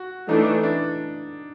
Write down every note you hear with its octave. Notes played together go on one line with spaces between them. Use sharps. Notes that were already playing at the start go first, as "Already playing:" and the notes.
Already playing: F#4
E3 A3 D4 D#4
D4